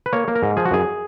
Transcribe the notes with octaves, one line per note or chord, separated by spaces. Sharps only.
B4
A#3 C#5
A#3
A#4
G#2
F3 G#4
F#4
F#2 G#4